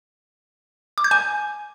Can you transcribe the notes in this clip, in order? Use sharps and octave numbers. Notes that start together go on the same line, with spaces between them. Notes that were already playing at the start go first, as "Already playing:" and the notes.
D6
G6
G#5